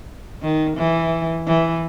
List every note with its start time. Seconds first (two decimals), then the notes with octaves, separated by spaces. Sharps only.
0.42 D#3
0.77 E3
1.47 E3